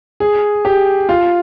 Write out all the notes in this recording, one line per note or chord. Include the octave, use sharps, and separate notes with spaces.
G#4
G4
F4